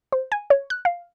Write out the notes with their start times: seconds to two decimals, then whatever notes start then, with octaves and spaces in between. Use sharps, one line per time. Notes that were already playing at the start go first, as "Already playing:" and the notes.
0.12 C5
0.32 G#5
0.50 C#5
0.70 F#6
0.85 F5